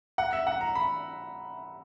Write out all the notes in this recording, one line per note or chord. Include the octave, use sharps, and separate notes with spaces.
F#5
E5
F#5
A#5
B5